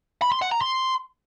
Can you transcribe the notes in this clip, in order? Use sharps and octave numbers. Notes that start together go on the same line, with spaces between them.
B5
C6
F#5
A#5
C6